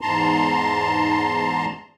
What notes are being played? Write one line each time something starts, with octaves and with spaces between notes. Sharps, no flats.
E2 G#2 A5 A#5 C6